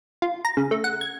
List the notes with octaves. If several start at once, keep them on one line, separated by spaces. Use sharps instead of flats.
F4
A#5
C#3
A3
F#5
G#6